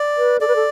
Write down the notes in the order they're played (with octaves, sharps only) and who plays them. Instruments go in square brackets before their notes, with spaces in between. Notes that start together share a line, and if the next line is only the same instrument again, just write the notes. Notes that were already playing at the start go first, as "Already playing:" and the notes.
Already playing: [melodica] D5
[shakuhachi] B4
[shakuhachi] A4 [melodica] D5
[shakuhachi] B4
A4